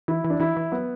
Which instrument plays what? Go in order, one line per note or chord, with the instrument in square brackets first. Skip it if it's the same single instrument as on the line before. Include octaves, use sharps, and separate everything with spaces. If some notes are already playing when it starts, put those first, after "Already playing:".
[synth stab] E3 [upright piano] E4
[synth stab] E3
[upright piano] D4
[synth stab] E3 [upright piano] E4
[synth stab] E3
[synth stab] F#3 [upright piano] B3